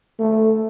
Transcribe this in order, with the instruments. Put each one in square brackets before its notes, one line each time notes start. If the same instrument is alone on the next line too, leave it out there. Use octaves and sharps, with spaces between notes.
[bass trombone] A3